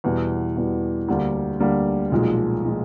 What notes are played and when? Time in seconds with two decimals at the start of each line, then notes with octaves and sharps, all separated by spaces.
0.04 E2 B2 G3
0.57 E2 B2 G3
1.08 D2 D3 G3 A#3
1.60 D2 D3 G3 A#3
2.12 B1 A#2 F3 G#3
2.64 A#2 F3 G#3